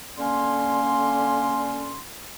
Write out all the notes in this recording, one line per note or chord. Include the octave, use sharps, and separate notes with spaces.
D3 A#3 C#4 C6